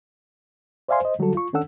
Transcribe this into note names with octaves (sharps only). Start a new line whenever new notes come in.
C5 D5 E5 F5 G#5 C6
C5 D#5
D3 F#3 G3 F#4 A4
F4 C#6
D#3 C#4 D4 A4 F#5 E6